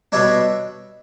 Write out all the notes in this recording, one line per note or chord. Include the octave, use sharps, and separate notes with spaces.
B2 G3 D4 C#5 E5